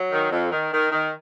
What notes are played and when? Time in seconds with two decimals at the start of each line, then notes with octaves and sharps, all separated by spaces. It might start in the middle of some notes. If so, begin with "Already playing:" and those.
Already playing: F#3
0.12 D#3
0.32 F2
0.52 D#3
0.72 D#3
0.91 D#3